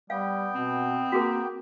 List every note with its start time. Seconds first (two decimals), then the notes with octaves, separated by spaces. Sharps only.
0.10 G3 B3 F5 G5
0.55 B2 C4
1.12 A#3 F#4 G#4 A#4